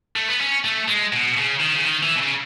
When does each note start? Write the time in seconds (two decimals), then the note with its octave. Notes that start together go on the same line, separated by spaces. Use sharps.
0.16 A3
0.28 B3
0.40 C#4
0.64 A3
0.88 G#3
1.13 B2
1.37 C#3
1.60 D#3
1.75 C#3
1.85 D#3
2.03 E3
2.16 B2
2.21 C#3